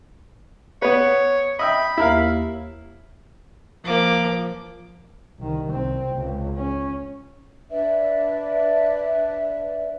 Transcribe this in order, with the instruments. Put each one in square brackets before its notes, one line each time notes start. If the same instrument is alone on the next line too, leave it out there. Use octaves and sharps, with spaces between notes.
[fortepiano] B3 B4 [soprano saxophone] C#5
[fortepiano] D#5 E5 G5 [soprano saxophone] B5
[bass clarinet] D#2 [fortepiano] E4 A#4 F5
[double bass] F3 [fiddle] A#3 D6
[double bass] C2 D#3
C2 C4
C#2
C#4
[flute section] D4 B4 D5 E5